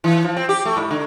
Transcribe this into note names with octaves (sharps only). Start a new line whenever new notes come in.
E3
F3
C4
G4
A3
G#2
D3